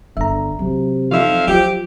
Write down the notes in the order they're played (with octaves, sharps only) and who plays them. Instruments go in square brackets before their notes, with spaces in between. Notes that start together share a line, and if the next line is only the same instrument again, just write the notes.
[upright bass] G1 [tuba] D3 [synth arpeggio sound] E5 A#5
[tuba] C3 [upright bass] E3 F#3
[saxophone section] F2 E5 F5 [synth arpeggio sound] F3 D#4
[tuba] F3 [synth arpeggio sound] F#3 [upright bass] F4 [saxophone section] G4